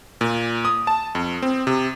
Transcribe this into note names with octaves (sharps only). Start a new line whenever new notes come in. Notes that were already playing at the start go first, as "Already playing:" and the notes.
A#2
D#6
A5
F2
C4
C3